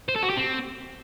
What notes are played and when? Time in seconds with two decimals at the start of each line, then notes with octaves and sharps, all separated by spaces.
0.09 C5
0.16 A4
0.23 F#4
0.30 G4
0.37 C4